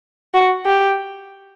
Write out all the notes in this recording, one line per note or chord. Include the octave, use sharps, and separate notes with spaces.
F#4
G4